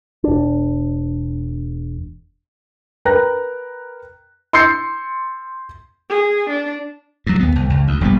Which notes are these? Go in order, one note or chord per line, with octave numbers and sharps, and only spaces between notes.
E1 D4
A#4 B4 G5 A#5 F#6 A#6
C6 E6 G6 A6 C7 C#7
G#4
D4
G2 F#3
D#2 B3
C2
C#2
D2
E1 A#1 G3 B3